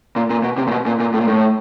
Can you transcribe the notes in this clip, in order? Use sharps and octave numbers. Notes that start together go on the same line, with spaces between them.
A#2
A#2
B2
C3
A#2
B2
A#2
A#2
A2
A#2
A2